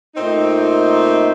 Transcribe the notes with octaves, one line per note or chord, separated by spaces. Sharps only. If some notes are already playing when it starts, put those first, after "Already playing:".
A#2 A3 C4 D#4